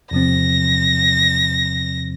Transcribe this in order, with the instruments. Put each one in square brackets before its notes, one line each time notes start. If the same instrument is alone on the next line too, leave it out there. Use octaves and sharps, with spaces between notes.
[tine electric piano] E2 C3 F3 C4 [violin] A#6